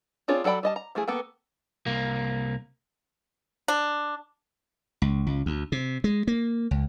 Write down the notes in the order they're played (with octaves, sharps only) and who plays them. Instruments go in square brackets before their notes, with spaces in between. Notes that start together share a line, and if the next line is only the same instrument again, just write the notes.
[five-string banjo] C4 D4 F4 G#4 C#5
F#3 A4 D5 G5 B5
G3 D#5 A5
A#5
F3 A3 E4 G#4
A#3 B3 A4 G5
[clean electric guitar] C2 A#3
[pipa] D4
[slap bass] C#2
C#2
D2
C3
G#3
A#3
C#2